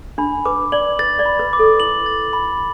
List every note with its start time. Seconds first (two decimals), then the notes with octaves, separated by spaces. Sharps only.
0.18 D4 B5
0.45 B4 D6
0.72 D5 F#7
0.99 B4 A6
1.19 D5
1.26 B5
1.39 B4
1.53 D6
1.59 A4
1.80 E4 F#7
2.06 A6
2.33 B5